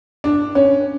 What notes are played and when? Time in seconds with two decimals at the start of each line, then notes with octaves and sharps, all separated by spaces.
0.24 D4
0.55 C#4